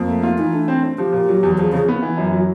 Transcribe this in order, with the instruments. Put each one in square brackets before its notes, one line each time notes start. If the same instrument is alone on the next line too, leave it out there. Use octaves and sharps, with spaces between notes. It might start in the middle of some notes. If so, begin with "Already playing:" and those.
Already playing: [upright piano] F2 [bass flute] A#3
[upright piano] A3
F4
[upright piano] E3 [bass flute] D#4
[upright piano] A3 [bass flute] D4
[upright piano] C4
C4
[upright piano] F3 [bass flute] G4
[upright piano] A#2
F#3
E2
[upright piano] F3 [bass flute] G#4
[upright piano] C#3 [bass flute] G#4
[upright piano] B3
E3
F#2
F#3